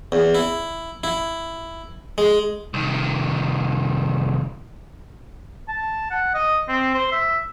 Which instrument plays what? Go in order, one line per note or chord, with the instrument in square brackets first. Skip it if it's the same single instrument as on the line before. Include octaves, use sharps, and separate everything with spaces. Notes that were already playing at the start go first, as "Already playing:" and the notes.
[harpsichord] E2
E4
E4
G#3
[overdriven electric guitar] C2 D#3
[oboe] A5
F#5
D#5
C4
C5
E5